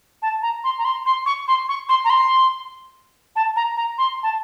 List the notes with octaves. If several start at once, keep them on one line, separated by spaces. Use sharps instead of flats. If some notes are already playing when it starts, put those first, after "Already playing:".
A5
A#5
C6
A#5
C6
C6
C#6
C6
C#6
C6
A#5
C6
A5
A#5
A#5
C6
A5